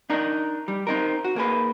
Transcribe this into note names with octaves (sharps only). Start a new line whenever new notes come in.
D4 D#4 A#4
G3
C4 D#4 A#4
F#4
A#3 G#4 B4